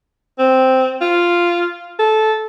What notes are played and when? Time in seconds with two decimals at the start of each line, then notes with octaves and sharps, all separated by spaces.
0.39 C4
1.01 F4
1.99 A4